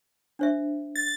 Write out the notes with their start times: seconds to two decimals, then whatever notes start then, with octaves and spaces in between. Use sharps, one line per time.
0.39 D4 C5 E5
0.95 A6